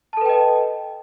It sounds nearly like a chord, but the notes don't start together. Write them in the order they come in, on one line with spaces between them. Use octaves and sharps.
A5 A4 B4 G5 D#5